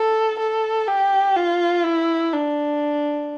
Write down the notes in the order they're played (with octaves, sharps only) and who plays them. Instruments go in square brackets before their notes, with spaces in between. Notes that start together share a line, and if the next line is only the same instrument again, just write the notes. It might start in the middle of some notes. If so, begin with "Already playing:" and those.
Already playing: [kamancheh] A4
A4
G4
F4
E4
D4